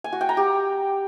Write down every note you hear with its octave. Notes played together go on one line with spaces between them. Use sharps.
G#5
F#4
G5
A#5
G4